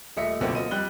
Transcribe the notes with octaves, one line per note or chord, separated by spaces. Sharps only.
D#1 A3 D#5 E5 C#7
C#2 B2 D3 F#3 A#3 C4
F3 F4 D#5 D#7
F2 G3 F#6 G7